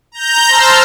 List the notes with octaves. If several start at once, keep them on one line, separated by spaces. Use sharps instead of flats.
A#5 G6
C5 A5 E6 F6